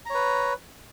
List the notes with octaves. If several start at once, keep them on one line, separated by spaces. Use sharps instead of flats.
B4 C#5 A#5